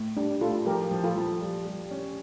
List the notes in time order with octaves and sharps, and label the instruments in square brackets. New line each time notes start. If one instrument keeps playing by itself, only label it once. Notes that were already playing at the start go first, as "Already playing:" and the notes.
Already playing: [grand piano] A2
[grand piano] G3 [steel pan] D4
[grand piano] A2 [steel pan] F4 A4
[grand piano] F3 [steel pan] G4 A#4
[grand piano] F3
[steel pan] F4 A4
[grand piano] F3
G3
G3
C#4